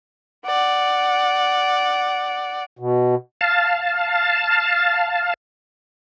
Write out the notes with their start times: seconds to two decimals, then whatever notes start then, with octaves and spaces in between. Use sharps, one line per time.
0.46 D5 F#5
2.79 B2
3.41 F5 A5